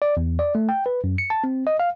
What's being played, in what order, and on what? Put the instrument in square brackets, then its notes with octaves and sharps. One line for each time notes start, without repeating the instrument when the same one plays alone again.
[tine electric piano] D5
E2
D5
A3
G5
B4
F#2
C#7
A5
C4
D#5
F5